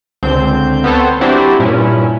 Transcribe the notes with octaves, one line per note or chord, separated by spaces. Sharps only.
C#2 D3 C4 G6
B3 C4 A4 C5 C#5
F#3 C4 D4 E4 F#4 G4
G2 A#2 C#4 E4